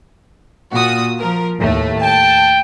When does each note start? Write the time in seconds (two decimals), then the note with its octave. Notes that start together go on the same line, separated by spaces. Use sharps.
0.72 A#2 F#4 D#6
1.19 F3 A#4
1.59 D#2 A2 A3
2.02 G5 A5